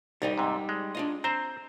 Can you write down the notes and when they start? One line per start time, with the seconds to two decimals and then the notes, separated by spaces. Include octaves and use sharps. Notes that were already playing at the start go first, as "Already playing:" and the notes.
0.22 C2 G3 D#4 D#5
0.38 G#2 C3
0.69 G#3
0.95 D4 F4 D#5
1.24 C4 C5 A#5